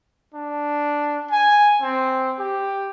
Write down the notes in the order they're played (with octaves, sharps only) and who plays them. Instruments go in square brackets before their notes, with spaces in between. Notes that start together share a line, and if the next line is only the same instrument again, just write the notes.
[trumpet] D4
G#5
C4
G4